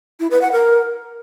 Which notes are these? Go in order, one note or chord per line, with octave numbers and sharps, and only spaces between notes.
E4
B4
F#5
A#4